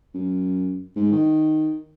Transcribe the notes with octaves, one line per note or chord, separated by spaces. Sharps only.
F#2
G#2
D#3